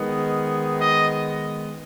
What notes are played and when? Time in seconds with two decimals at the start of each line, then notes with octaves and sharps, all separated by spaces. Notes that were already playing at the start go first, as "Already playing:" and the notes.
Already playing: D#3 G#3 B3
0.80 D#5